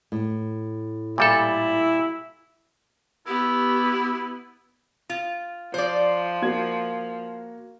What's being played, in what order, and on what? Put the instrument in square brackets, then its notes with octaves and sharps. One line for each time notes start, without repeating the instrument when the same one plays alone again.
[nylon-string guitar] A2
[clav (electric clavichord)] A#2 G3 A4 [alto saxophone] E4
[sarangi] B3 [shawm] E4 [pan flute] G4
[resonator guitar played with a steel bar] F4
[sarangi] F3 [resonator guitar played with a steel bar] C5 D5
[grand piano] A#3 F#4 G#6